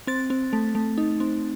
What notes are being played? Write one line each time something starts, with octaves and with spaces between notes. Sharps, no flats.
C4 A6
C4
A3
A3
D#4
C4